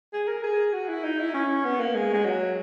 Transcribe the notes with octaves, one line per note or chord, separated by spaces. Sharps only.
G#4
A#4
G#4
F#4
E4
D#4
E4
C#4
B3
A#3
G#3
G#3
F#3